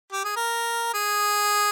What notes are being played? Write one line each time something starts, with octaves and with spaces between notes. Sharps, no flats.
G4
G#4
A#4
G#4